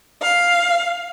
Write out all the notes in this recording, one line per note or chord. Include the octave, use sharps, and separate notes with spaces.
F5